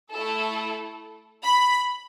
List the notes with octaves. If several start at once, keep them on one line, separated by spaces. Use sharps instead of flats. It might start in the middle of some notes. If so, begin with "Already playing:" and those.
A3 E4 A4
B5